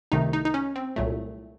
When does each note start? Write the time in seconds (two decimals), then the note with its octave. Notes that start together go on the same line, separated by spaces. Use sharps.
0.12 C2 C3 D#3 A3 D#4
0.33 D#4
0.45 D#4
0.54 C#4
0.76 C4
0.96 C2 A#2 F#3 A3